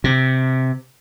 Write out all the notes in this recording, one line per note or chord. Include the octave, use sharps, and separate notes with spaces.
C3